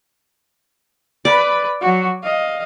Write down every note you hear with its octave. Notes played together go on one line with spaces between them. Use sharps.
B4 D5 B5
F#3 F#4
D#5 F5